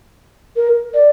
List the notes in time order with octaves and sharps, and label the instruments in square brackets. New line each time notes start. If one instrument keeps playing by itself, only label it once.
[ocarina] A#4
D5